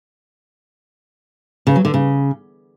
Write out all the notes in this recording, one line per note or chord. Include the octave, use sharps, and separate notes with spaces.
C#3
F#3
D3
C#3